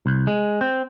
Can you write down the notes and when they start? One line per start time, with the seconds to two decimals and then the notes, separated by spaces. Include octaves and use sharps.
0.06 C2
0.27 G#3
0.61 C4